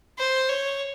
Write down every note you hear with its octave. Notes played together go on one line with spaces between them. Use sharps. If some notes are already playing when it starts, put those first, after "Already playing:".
C5
C#5